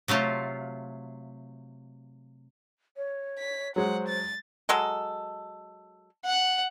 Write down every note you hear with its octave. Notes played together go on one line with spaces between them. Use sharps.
C3 F#3 A3 F4
C#5
B6
F#3 G#3 C5 F#5
A6
F#3 G#3 A4
F#5